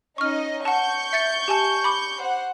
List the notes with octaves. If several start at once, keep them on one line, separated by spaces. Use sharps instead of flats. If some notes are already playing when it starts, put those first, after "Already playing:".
C#4 D#4 D#5 C#6 F6
F#5 A5 C#6 G6
E5 A6 C#7
G4 G#5 A5
B5 D6
C5 F#5